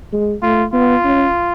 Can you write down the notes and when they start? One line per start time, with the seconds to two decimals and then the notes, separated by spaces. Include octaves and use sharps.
0.12 G#3
0.43 A3 F4
0.73 B3 F4
1.04 C#4